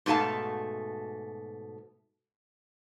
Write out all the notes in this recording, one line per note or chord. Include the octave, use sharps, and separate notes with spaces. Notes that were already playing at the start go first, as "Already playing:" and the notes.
G#2 B2 A3 G#4 F5 A5